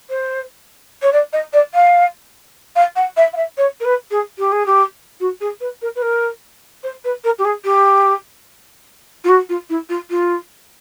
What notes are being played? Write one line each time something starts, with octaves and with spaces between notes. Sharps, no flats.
C5
C#5
D5
D#5
D5
F5
F5
F#5
E5
F5
E5
C#5
A#4
B4
G#4
G4
G#4
G4
F#4
G#4
B4
A#4
B4
A#4
C5
B4
A#4
G4
G#4
G4
F4
F#4
F4
E4
F4
F4